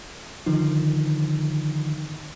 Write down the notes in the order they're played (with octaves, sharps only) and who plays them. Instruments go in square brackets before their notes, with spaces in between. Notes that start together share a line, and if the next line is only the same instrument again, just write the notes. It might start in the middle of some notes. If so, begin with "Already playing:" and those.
[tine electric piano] D3 D#3 F3 D#4